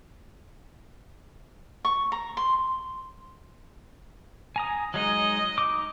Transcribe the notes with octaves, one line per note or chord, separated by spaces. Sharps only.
C#6
A#5
C6
G#5 A#5 D#6
F#3 G#3 D#4 D#5
D#4 D6